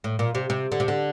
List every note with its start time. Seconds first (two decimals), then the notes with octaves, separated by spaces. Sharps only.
0.04 A2
0.19 A#2
0.35 C3
0.50 C3
0.72 D3
0.80 C3
0.88 D3